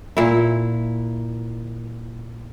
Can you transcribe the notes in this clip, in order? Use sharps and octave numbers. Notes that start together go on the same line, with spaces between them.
A#2 E4